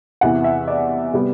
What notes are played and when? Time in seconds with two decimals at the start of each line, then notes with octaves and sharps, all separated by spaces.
0.21 E2 C3 E3 F#5
0.44 E5
0.68 D5
1.13 C3 G3 B3